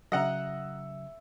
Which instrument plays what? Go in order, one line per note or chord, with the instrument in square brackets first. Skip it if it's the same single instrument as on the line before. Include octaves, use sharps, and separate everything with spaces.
[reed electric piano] C#3 F#3 [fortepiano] D#5 F#5 A#5 [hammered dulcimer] E5